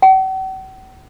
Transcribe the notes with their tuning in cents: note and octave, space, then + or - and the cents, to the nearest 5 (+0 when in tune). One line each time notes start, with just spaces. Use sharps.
F#5 +45